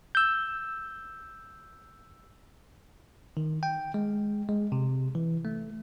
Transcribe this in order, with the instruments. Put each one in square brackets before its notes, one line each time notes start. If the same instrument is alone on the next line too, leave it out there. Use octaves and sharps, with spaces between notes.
[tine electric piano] E6 G6
D#3
G5
G#3
G#3
C3
E3
A3